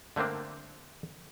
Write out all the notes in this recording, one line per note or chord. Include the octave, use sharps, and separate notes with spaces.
D3 A3 A#3 C4 D4